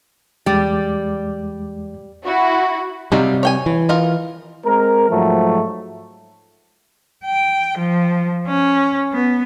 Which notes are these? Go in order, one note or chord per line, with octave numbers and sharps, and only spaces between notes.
E2 G3 G#3 D6
E4 F#4
C3 F#3 G3 D#4 F4
C#5 G5 G#5
E3
D#4 F4 A#4
G#3 C4 A#4
G#2 F3 F#3 A3
G5
F3
C#4
B3